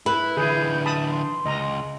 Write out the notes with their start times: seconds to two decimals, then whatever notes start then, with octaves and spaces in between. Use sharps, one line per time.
0.06 E4 B4
0.37 D3 E3 E4 G#4 G6
0.86 E5 A5 B5 D#6
1.09 C6
1.46 C#2 D#5 A#5